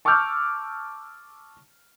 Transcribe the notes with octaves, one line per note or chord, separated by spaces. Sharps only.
A5 C#6 D6 E6 F6 G6